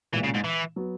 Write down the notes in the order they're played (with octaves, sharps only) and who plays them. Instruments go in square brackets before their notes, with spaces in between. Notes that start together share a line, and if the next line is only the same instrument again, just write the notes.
[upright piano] B1 A#2 G#3 [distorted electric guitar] E3
[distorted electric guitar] C#3
G#2
E3
[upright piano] F#3 B3